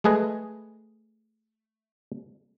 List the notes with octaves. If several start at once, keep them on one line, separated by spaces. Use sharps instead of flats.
G#3 A3 G#4 B4 D#5